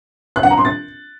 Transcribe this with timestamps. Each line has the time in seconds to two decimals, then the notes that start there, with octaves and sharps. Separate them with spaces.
0.36 F#6
0.43 F#5
0.50 A#5
0.58 C6
0.65 A6